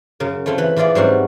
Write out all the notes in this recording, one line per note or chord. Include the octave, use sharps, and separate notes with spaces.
F#2 C#3 A#4
A3 C4 E4 F4
E3 B4
E3 E4 F4 G#4 D5
G#2 F#3 G3 C4 C#4 F#4